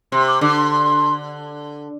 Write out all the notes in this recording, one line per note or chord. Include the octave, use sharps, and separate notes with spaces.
C3 C6
D6
D3 D6
C6
C6